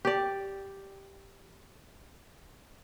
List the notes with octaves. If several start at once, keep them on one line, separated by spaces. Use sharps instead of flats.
G4 D5